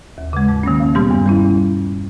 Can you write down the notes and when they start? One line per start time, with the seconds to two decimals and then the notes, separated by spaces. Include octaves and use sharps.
0.18 D#2
0.33 C#3 G#3
0.49 G#2
0.63 D#3 A#3 C#4
0.80 E2
0.95 B2 G3 B3 G4
1.11 G2
1.26 G3 C#4 E4